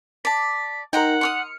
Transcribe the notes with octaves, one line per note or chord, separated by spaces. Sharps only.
D5 A5 B6
D#4 A#4 F#5 G5 A#5 C6
C6 D6 D#6 F6 C#7